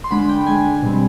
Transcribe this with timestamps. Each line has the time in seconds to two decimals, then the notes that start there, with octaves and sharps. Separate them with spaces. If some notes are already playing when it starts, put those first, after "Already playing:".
0.04 C6
0.11 D3 G#3 D4 B5
0.29 G5
0.47 D3 G#3 D4 G#5
0.83 B2 G3 C4